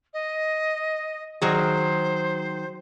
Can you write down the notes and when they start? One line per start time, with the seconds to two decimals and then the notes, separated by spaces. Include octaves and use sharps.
0.14 D#5
1.42 D#3 F#3 G#4 C5